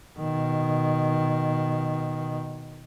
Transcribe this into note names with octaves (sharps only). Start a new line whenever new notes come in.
B2 D#3